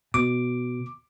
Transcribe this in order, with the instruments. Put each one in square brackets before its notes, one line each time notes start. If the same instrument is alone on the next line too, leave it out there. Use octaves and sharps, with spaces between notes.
[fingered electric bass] B2 [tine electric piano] D6